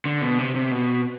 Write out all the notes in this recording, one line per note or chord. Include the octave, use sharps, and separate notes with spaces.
D3
B2
C3
C3
B2